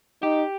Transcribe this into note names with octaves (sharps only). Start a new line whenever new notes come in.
D#4 G4